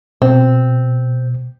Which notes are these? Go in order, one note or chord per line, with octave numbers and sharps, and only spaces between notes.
B2 C4